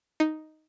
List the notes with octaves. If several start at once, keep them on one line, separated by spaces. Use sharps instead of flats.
D#4